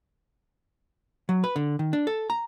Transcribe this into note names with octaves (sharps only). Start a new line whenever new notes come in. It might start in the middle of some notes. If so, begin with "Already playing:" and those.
F#3
B4
D3
D#3
D4
A4
A#5